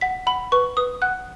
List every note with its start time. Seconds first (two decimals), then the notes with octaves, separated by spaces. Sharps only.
0.01 F#5 B6
0.27 F#5 B5
0.52 B4 C#6
0.77 B4 D#6
1.02 F#5 F#6